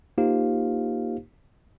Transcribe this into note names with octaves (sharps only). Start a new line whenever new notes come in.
A#3 D#4 F4 G4 C5 F5